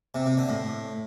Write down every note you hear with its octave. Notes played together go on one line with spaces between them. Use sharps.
C3
C3
D3
A2